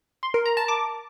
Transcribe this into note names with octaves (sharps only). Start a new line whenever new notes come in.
C6
A#4
A#5
A5
D6